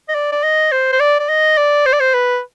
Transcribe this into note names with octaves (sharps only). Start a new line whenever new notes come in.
D#5
D5
D5
D#5
C5
C5
D5
D5
D#5
D5
C5
D5
C5
B4